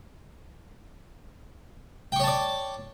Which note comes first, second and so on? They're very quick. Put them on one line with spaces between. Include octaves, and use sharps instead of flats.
G5 C#6 C#5 A5 D5